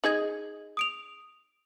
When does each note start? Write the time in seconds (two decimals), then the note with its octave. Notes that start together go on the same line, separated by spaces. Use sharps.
0.04 D#4 G#4 D#5 G#6 F#7
0.77 D#6 D7 F7